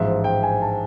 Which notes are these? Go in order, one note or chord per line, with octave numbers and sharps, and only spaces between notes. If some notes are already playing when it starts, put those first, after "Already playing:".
Already playing: A1 G#2 F3 E5
G5
G#5
A5